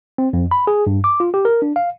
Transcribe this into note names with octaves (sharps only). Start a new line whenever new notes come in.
C4
F2
B5
G#4
G2
D6
F4
G4
A#4
D4
F5